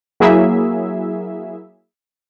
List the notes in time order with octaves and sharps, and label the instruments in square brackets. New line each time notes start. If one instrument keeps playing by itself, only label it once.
[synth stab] F#3 A#3 E4 G#4 E5